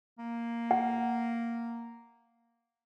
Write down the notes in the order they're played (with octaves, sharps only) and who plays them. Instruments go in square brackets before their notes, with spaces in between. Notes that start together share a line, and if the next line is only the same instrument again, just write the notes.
[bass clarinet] A#3
[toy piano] F#5